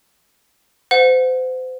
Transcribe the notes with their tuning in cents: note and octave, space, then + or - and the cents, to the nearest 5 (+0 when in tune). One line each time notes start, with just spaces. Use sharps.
C5 -35 F#5 -30